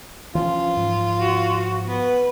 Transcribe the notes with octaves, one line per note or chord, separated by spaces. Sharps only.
E3 F3 C#4 F4
G#2 F3
F#4
B3 B4